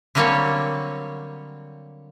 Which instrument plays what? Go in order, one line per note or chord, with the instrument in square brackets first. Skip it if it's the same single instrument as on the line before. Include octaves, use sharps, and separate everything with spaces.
[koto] D3 F#3 G3 A#3 C4 C#5